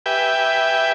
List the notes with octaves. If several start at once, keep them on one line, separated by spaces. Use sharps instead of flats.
G4 B4 E5 G5 G#5